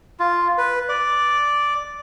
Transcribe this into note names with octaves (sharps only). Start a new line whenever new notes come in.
F4
B4
D5